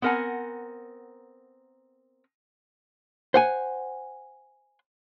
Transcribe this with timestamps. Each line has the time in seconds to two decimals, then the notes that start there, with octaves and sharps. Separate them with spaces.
0.02 B3 C4 A#4 F#5 G#5
3.34 C5 F#5 G#5